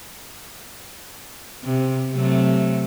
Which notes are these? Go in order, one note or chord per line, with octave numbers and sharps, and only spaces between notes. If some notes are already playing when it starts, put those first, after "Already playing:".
C3
C3 F#3 A3